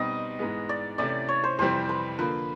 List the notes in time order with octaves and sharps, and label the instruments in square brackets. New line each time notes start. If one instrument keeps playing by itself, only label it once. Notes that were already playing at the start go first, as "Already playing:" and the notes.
Already playing: [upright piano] B2 G3 C4 D#4 [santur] D#5
[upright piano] G#2 E3 G#3 B3
[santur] D5
[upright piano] C3 E3 A3 C#4 E4 [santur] D5
[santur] C#5
C5
[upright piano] F2 C3 E3 G3 C4 [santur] C5
[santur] B4
[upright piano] D3 F3 A#3 [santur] B4